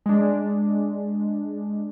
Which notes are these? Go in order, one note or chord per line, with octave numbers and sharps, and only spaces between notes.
G#3 D4